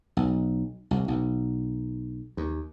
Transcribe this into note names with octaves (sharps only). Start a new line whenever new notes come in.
B1
C2
B1
D#2